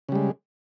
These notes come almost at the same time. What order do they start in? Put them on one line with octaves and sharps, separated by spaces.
C#3 G3 G#3